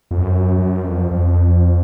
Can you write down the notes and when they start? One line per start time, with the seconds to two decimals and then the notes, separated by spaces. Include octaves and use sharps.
0.11 F2
0.19 F#2
0.58 F#2
0.84 F2
1.11 F2